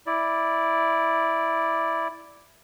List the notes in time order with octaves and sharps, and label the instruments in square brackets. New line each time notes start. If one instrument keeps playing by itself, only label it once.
[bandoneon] E4 D5